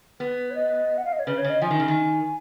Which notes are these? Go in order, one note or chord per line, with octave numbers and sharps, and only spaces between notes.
B3 B4
C#5
D#5
F#5
F5
D#5
C#5
C#3 B4
C#5
C#3
D#5
F3 G#5
D#3
C#3
D#3